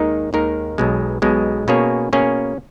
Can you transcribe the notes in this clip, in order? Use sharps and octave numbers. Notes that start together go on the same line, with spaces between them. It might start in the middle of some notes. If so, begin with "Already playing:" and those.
Already playing: D#2 D#3 G#3 D#4 A#4
D#2 D#3 G#3 D#4 A#4
B1 B2 G#3
B1 B2 G#3
B2 A#3 C#4 G#4 C#5
B2 A#3 C#4 G#4 C#5